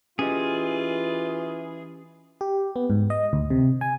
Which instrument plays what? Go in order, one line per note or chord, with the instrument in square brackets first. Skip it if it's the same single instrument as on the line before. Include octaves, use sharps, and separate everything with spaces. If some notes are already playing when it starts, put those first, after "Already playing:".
[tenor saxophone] E3 [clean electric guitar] C#4 G4 D#5 [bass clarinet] F4 [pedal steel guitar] G#4
[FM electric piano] G4
B3
G#2
D#5
D2
C3
G#5